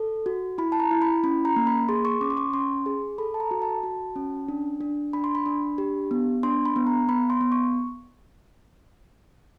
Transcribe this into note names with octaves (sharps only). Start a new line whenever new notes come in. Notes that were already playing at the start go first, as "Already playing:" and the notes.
Already playing: A4
F#4
E4 B5
A5
A#5
E4
B5
C#4 B5
A#5
A#3
B5
G#4 C6
C#6
C#4 D6
C6
C#6
C#4 C6
G#4
A4 B5
A5
A#5
F#4
A5
F#4
C#4
D4
D4
D4 B5
C6
B5
D4
G4
B3
D4 C6
B5
B3
A#5
B3 B5
C6
B3
C#6